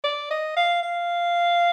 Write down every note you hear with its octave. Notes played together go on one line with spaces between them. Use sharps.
D5
D#5
F5
F5